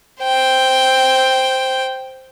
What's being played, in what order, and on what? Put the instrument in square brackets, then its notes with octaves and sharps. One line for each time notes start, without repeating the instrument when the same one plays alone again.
[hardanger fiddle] C5 G5